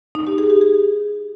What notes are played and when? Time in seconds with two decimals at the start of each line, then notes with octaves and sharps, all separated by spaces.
0.15 D#4
0.27 G4
0.38 G#4
0.50 G4
0.61 G#4